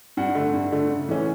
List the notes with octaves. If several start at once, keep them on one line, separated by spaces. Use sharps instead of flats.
G2 F#5
D3 A3
G2
D3 A3
C#3
E3 A3 C#4